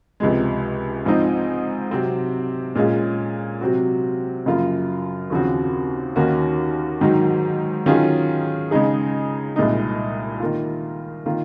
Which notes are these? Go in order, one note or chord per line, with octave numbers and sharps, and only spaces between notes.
C#2 C3 F3 G#3
G#2 F3 C4 D#4
C3 F#3 C4
A#2 G#3 C#4 F4 G#4
C3 F#3 C4 F#4
F#2 C#3 F3 A#3 F4
D#2 C#3 F3 C4 F#4
D#2 D#3 A#3 C#4 F#4
G#2 D#3 F#3
D#3 F#3 C#4 F4 G#4
C#3 G#3 D#4 G#4
C2 A#2 G#3 D#4
D#3 A#3 F4
D#3 A#3 F4